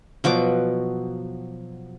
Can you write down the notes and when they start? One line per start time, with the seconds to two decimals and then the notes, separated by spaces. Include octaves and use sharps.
0.24 B2 F3 F#3 D6